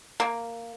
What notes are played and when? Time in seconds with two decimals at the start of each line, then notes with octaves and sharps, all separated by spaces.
0.20 A#3